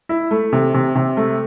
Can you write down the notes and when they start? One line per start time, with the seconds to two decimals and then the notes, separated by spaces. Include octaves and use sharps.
0.09 E4
0.31 A3
0.53 C3
0.74 C3
0.95 C3
1.17 A3